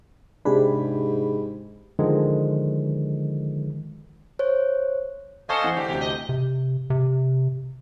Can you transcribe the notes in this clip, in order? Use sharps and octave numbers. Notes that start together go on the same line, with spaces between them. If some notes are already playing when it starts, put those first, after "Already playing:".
G#2 C3 D4 G4 G#4 B5
D3 D#3 F3 G#3
C5 C#5
A4 C5 D#5 F5 G#5 A5 C#6
E3 F#5 G#5
D3 A3 D4 G4
D2 C3 C#4 G4
D#5
C3
C3